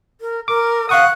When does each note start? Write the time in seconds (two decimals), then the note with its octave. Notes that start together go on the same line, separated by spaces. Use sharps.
0.21 A#4
0.48 A#4 D6
0.89 F5 F#5 C#6 D#6